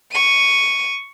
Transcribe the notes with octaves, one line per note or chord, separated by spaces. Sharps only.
C#6 D#7